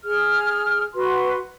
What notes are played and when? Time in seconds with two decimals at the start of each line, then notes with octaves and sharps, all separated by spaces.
0.04 G#4 F6
0.94 F#4 B4 C6